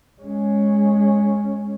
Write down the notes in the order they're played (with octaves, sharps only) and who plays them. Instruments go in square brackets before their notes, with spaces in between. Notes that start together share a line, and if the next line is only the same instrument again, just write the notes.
[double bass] G#3 C#4